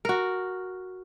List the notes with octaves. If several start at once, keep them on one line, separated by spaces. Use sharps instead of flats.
F#4 A#4